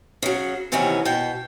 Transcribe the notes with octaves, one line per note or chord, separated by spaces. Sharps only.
C#3 F#3
D#2 C3 D#3 E3 B3 C#4
B2 G5